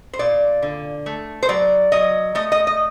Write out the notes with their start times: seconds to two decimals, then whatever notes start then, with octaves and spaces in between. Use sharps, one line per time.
0.13 C5
0.19 A#2 D5
0.62 D3
1.06 A3
1.43 C5
1.49 F#3 D5
1.92 F#3 D#5
2.35 A3 D#5
2.52 D#5
2.67 D#5